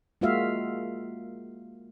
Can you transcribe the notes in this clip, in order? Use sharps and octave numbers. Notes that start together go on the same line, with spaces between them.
G#3 A#3 F4 F#4 E5 F5